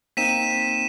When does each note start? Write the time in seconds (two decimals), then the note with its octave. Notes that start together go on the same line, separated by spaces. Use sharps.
0.17 A#3 C4 D#4 B6 D#7 E7